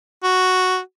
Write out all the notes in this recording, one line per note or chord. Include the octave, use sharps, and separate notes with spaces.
F#4